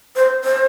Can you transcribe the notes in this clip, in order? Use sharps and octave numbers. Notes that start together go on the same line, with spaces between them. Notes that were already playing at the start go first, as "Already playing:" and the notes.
C5
C5